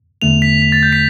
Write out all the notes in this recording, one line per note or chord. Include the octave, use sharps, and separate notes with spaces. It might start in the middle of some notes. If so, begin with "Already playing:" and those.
E2 D3 A3 F7
B6
B6
A6
G6
B6